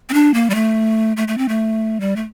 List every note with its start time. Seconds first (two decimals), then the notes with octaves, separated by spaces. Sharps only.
0.09 C4
0.14 D4
0.34 A#3
0.50 G3
0.55 A3
1.17 A3
1.28 A3
1.38 C4
1.49 A3
2.00 G3
2.16 A3